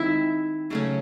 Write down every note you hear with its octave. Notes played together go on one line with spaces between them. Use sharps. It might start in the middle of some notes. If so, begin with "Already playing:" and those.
Already playing: D#3 G#3 C4 E4 E5
C#3 F#3 A3 C#4